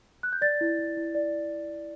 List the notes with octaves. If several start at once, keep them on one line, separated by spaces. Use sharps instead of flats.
F#6
G6
D5 A6
E4
E4
E4
D5